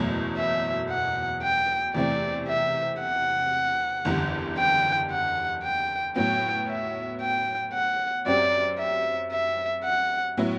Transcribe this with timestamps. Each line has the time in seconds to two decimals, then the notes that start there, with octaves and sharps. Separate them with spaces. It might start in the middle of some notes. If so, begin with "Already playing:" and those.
Already playing: F#1 E2 B2 F#3 A3
0.37 E5
0.90 F#5
1.43 G5
1.95 E2 C3 E3 A3 C4 D5
2.48 E5
3.00 F#5
4.05 F#1 E2 D3 G3
4.58 G5
5.11 F#5
5.63 G5
6.16 A2 F#3 B3 G5
6.69 E5
7.21 G5
7.74 F#5
8.26 F#2 F#3 C4 G4 D5
8.79 E5
9.32 E5
9.84 F#5
10.37 A2 F#3 B3 E4